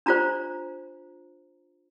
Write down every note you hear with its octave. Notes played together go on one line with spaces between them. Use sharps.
D4 F4 C5 A#5